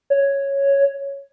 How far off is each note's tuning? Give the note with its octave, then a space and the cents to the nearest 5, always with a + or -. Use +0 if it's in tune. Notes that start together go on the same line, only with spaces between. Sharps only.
C#5 +0